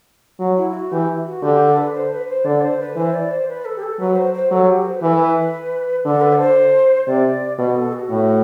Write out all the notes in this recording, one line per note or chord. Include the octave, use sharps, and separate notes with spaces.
F#3
E4
F#4
E3 G4
F#4
D3 G4
A4
B4
C5
B4
C5
D3 D5
C5
B4
E3 C5
D5
C5
B4
A4
G4
A4
F#3 B4
C5
C5
F#3 A4
G4
C5
B4
E3 A4
B4
D3 A4
B4
D5
C5
C3 D5
B2 B4
A4
F#4
A2